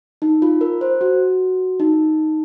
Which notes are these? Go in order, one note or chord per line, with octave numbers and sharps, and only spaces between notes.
D#4
F4
A#4
C5
F#4
D#4